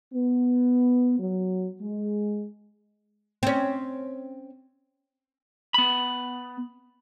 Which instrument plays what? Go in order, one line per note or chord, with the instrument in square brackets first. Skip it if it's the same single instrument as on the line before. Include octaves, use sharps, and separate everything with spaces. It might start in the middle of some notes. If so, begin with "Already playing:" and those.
[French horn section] B3
F#3
G#3
[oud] C4 C#4
[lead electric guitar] B3 B5